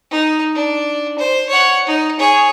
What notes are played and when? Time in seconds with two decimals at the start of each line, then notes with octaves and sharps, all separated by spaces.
0.11 D#4
0.54 D4
1.18 C5
1.49 C#5 F#5
1.87 D#4
2.19 G#4 C#5